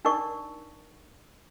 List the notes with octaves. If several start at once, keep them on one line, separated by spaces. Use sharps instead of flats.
D4 D#4 A#4 D5 C#6